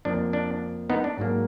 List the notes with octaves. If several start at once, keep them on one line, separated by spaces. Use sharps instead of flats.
F2 F3 A#3 D4
D4
B3 D#4
D4
G#2 F#3 A#3